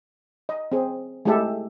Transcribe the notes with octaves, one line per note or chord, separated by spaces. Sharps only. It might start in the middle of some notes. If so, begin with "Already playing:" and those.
D#5
C4 G#4
G#3 A3 E4 G4 A4 E5